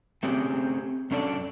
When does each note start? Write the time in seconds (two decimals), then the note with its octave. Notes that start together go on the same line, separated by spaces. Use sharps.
0.23 A3 C4 C#4 G4 G#4
1.11 F#2 C#4 D4 A4 D5